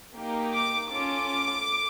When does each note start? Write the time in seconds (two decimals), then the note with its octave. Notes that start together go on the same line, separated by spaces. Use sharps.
0.16 A#3 D#4 G4
0.53 D6
0.91 C#4 F4 A4 D6